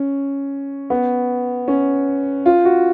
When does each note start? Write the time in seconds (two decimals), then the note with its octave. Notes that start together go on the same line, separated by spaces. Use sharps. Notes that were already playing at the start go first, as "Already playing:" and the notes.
Already playing: C#4
0.90 B3
1.68 C#4
2.46 F4
2.65 F#4